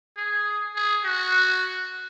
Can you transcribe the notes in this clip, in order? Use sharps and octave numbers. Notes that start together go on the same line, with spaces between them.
G#4
G#4
F#4